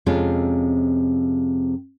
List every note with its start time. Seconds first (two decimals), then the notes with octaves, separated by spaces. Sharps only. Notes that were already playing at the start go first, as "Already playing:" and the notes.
0.06 F2 C3 G#3 C4 C#4 F4